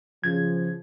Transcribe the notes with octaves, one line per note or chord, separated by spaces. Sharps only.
C#3 F3 G#6